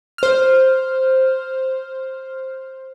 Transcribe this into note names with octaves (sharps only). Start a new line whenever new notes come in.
C5 F6